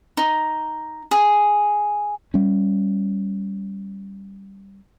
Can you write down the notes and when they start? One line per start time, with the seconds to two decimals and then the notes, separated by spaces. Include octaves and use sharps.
0.17 D#4
1.11 G#4
2.34 G3 C#4